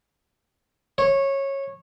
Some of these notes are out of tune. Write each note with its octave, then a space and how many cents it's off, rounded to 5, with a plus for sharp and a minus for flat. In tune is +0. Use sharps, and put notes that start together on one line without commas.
C#5 -15